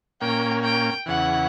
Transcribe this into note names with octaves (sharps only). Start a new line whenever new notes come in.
A#2 A#3 C#4 G5
G5
E2 C#3 E3 F#5